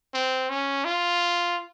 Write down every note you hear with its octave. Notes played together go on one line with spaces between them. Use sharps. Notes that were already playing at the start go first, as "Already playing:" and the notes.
C4
C#4
F4